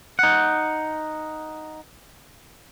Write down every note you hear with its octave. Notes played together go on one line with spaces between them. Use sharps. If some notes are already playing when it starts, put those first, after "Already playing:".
D#4 F#5